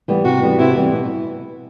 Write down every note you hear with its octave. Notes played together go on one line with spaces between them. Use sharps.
E3 G3 B3
C3 F#4
E3 G3 B3
C3 E4
E3 G3 B3
B2